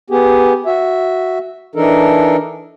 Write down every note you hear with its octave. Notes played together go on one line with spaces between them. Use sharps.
B3 G4 G#4
F#4 E5
E3 D4 D#4 A4 A#4